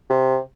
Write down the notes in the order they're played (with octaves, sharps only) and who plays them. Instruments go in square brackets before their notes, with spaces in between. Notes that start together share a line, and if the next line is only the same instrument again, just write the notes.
[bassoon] C3